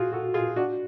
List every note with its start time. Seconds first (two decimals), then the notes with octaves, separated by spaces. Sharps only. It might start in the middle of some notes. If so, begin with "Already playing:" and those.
Already playing: F4 F#4 G#4
0.12 F#4 A4
0.34 F4 G#4
0.56 D4 F#4